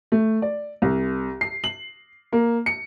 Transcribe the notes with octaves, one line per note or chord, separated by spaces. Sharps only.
A3
D5
C2
C7
F#7
A#3
C#7